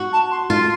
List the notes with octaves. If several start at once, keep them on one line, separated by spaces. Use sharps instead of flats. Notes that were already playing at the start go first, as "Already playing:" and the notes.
Already playing: F#4
A5
C6
F4 C6